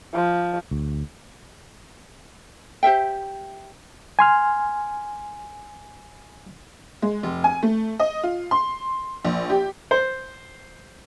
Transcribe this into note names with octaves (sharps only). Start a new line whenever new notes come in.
F3
D2
G4 C5 E5 G5
G#5 C6 F6
G#3
F1
G#5
A3
D#5
F4
C6
A#1
G4
C5